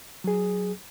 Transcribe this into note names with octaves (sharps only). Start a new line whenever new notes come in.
F#3 G#4